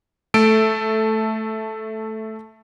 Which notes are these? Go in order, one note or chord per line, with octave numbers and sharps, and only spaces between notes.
A3 A4 D7